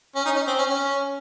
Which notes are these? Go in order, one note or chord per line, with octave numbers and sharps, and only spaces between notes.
C#4
D#4
C#4
C4
C#4
C#4